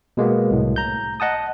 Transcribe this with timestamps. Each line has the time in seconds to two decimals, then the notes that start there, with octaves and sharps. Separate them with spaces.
0.17 B2 G#3 A#3 B3
0.51 C2 A2
0.76 A#5 G6
1.20 D#5 F#5 A5 D#6